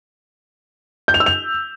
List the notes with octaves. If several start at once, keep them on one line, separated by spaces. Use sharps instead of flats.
G6
F7
E6
F7